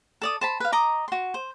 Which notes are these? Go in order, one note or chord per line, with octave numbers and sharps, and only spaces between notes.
A4 D5 D#6
C5 A5 B5
B4 F5
D#5 A#5 D6
F#4 C6
C5